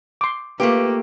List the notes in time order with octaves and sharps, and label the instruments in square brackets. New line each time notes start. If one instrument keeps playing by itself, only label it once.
[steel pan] C6 D6
[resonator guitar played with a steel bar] A3 F4 G4 [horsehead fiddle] A#3 [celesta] B4